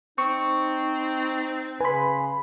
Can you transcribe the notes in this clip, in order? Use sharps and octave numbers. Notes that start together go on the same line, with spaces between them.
C4 D#4 C#6
C#3 B4 G#5 B5 C6